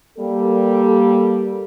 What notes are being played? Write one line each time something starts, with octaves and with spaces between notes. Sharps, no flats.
G3 A#3 A4